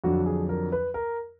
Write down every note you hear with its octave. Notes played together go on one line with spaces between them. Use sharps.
F2 D3 F#3 D4 F#4
G#4
A#4
B4
A#4